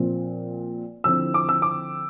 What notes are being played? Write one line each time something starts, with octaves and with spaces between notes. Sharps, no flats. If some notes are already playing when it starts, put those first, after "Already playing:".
Already playing: A#2 F3 C4 F4
D3 F3 C4 E4 E6
D6
E6
D6